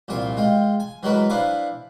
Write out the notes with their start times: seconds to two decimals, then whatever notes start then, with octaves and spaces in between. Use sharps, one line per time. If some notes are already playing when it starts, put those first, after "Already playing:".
0.08 C2 A#2 F4 G#5 C6
0.37 G#3 F4 G5
0.80 G#5
1.03 E3 F#3 G#3 F#4 A#4 B4
1.29 D4 E4 B4 C5 F5 G#5